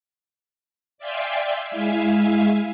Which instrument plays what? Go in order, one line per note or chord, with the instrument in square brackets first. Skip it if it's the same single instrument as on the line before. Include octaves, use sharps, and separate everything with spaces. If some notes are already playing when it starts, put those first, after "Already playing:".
[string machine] D5 E5 F5 G5 G#5 C6
G#3 E4 E5 F5 G#5